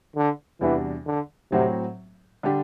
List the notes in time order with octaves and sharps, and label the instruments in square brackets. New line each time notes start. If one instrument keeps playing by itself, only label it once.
[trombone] D3
[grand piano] E2 C3 G3 D4 F#4 [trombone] E3
[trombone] D3
[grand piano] A2 F#3 C4 F#4 [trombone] C3
[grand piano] D3 G3 D4 G4